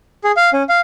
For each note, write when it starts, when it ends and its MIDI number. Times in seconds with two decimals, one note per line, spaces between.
0.24 0.32 68
0.37 0.50 77
0.53 0.63 61
0.69 0.80 77